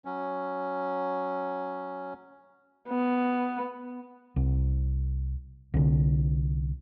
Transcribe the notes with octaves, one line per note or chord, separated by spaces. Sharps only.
F#3 C#4
B3
C2
C2 D3